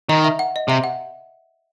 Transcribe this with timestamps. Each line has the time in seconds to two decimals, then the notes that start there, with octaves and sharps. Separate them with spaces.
0.09 D#3 D#5
0.24 E5
0.39 F#5
0.56 D#5
0.68 C3 E5
0.84 F#5